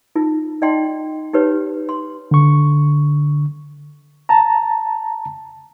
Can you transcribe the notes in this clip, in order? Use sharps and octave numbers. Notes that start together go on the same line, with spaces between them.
D#4 F4
D#4 D5 D#5 G5 C6
D#4 G4 B4 C#5
C6
D3 C#6
A5 A#5